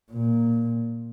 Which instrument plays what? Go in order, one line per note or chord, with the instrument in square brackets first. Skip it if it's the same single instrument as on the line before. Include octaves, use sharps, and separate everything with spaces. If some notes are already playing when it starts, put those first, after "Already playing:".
[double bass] A#2